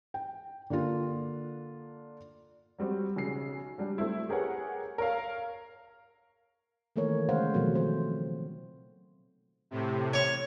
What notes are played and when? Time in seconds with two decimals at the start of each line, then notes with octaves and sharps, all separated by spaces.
0.14 G5
0.70 D3 A#3 D4 F4
2.78 F#3 G3 C4 F#4
3.16 B1 C#3 C7
3.78 F#3 G3 D4
3.98 A3 C4 E4
4.29 G4 G#4 A#4 B4 C#5 F#5
4.98 A#4 C#5 F5
6.96 D#3 E3 A3 A#3 A#4 C#5
7.29 C#3 G#3 A3 C5 F5 F#5
7.54 B2 D#3 F3 F#3 A3 C4
7.74 C4 C5
9.71 A2 C3
10.13 C#5